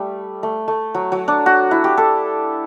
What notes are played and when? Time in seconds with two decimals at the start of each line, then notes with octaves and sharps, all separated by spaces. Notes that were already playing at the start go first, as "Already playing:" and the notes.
Already playing: G3 A3
0.43 A3
0.68 A3
0.95 F#3
1.12 F#3
1.28 D4
1.46 F#4
1.71 E4
1.84 G4
1.97 A4